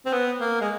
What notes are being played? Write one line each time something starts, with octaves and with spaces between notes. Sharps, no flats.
C4
B3
A#3
G#3